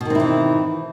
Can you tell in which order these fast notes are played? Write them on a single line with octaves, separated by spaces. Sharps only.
B2 D#3 C4 E4 E3